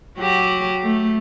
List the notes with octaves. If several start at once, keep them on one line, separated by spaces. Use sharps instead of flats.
F#3 F#4 G4
A3